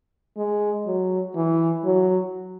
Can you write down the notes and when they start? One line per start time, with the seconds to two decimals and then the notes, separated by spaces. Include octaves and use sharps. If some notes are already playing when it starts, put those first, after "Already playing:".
0.37 G#3
0.86 F#3
1.35 E3
1.85 F#3